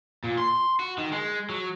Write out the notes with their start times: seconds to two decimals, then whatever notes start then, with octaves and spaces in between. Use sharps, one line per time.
0.24 A#2
0.38 C6
0.79 F#4
0.98 D#3
1.12 G#3
1.49 F#3